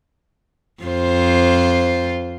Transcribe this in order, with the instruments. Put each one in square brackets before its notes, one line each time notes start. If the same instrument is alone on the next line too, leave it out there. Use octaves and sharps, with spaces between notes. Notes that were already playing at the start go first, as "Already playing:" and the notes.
[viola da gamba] F2 F4 C5